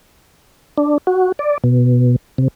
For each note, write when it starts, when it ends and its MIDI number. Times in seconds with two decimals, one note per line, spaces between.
0.78 0.98 62
1.07 1.32 66
1.39 1.58 74
1.64 2.16 47
2.38 2.48 48